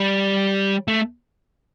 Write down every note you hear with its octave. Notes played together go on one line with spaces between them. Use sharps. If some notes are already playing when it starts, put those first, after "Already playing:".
Already playing: G3
A3